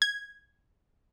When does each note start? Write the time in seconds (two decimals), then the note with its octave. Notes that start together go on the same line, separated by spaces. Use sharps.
0.02 G#6